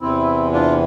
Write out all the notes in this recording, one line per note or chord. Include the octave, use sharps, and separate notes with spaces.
E2 C3 E3 C4 E4
D4 F4